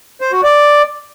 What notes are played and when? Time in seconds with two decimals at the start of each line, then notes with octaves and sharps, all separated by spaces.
0.21 C5
0.32 F#4
0.43 D5